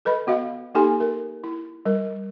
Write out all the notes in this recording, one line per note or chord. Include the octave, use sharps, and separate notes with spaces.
A4 B4 D#5 B5
B3 F#4 D#5 F5
A#3 D#4 G4 A4 G#5 C6
A#4
E4
G3 A#4